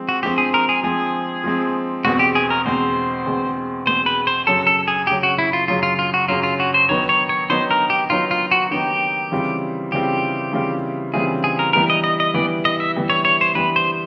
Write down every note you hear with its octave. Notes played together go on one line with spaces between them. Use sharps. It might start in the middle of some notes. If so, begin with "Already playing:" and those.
Already playing: F3 G#3 C4
F#4
F3 G#3 C4 G4
G#4
A#4
G#4
F3 G#3 C4 G#4
F3 G#3 C4
E2 B2 G#3 C4 F#4
G4
G#4
A#4
E2 B2 G#3 C4 C5
E2 B2 G#3 C4
E2 B2 G#3 C4 C5
B4
C5
F#2 C#3 F#3 A4
A4
G#4
F#2 C#3 F#3 G4
F#4
E4
F4
F#2 C#3 F#3 F4
F4
F4
F#4
F#2 C#3 F#3 F4
F4
F#4
C5
D#3 F#3 B3 D#4 C#5
C#5
C#5
D#3 F#3 B3 D#4 C5
A#4
G4
D#3 F#3 B3 D#4 F4
F4
F#4
D#3 F#3 B3 D#4 G4
C#3 E3 G3 C4 F4
C#3 E3 G3 C4 F4 G4
C#3 E3 G3 C4 F4
C#3 E3 G3 C4 F4 G#4
G#4
A#4
E3 G3 B3 A#4
D#5
D#5
D#5
E3 G3 B3 D5
D#5
E5
E3 G3 B3
C#5
C#5
C5
E3 G3 B3 B4
C5